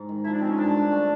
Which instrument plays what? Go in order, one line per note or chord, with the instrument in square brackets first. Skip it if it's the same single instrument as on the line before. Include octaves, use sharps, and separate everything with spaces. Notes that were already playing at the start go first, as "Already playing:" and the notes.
Already playing: [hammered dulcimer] G#2
D#3
[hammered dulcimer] F3 [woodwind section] E4
[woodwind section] D4
[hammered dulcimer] G#3 [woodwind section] C4
[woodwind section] C#4
[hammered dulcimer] G2 [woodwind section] D4
[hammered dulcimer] D3
A3